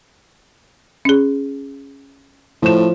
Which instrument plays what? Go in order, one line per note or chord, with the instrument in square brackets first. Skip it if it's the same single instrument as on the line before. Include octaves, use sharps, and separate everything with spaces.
[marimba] C#4 G#4
[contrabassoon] A2 [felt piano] F3 E7